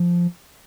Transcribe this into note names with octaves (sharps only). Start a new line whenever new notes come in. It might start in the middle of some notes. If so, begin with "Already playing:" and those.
Already playing: F3